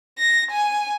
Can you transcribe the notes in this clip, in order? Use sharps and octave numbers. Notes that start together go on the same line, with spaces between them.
A#6
G#5